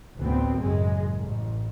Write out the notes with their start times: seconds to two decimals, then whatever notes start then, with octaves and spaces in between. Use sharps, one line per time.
0.18 A1 D2 A2 B3 C4
0.59 A1 F#2 C#3 G#3
1.15 A1